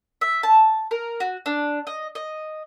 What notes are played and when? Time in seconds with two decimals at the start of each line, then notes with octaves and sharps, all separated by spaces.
0.21 E5
0.43 A5
0.91 A#4
1.20 F#4
1.46 D4
1.87 D#5
2.15 D#5